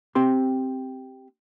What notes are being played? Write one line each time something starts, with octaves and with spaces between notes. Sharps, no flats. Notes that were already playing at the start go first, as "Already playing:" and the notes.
C4 G4 C6